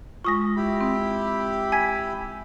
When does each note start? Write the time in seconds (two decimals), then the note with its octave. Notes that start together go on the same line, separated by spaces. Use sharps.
0.24 G#3 F4 C#6 D#6 A#6
0.56 E4 G4 B5
0.81 C4
1.72 G#5 G#6 B6